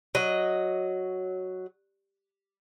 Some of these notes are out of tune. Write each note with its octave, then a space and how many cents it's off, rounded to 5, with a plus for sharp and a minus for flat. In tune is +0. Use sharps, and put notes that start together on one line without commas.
F#3 +0 D#5 +0